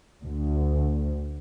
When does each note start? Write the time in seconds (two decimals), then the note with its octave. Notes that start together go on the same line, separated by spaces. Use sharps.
0.22 D2